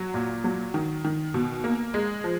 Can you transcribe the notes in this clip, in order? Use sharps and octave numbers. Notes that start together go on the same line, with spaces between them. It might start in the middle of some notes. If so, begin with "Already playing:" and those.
Already playing: F#3
A#2
F#3
D#3
D#3
B2
A#3
G#3
F3